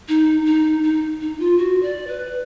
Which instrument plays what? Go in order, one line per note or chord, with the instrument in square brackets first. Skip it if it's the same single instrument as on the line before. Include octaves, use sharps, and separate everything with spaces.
[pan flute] D#4
D#4
D#4
D#4
F4
F#4
D5
B4